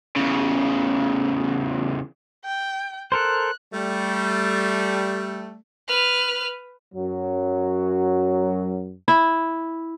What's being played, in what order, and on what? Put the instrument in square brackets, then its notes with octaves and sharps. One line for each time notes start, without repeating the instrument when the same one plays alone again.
[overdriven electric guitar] E2 C#3
[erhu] G5
[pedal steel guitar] A4 A#4 C5 [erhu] F#6
[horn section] G3 A3
[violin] B4 F6
[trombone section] F#2 F#3
[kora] E4